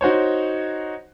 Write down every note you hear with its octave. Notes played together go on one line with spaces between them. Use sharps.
D#4 F#4 C5 C#5